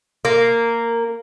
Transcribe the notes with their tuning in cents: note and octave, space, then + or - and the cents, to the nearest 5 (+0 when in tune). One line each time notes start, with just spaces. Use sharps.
A#3 -10